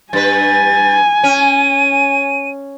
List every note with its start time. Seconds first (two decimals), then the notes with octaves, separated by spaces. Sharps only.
0.13 G2 B4 G#5 A6
1.24 C#4 D#7